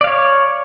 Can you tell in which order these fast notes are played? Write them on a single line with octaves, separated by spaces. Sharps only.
D5 F5 C#5